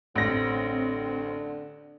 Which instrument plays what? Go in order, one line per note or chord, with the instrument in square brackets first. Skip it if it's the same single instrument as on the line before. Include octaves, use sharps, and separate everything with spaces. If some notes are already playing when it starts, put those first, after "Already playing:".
[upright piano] A1 A#6 [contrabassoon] D3 [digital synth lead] C4